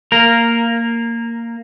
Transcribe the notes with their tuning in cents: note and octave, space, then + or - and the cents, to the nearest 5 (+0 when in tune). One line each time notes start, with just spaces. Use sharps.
A#3 -10 A#4 +0